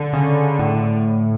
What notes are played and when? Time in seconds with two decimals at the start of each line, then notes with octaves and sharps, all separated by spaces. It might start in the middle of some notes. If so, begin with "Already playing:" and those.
Already playing: D3
0.13 C#3
0.59 A2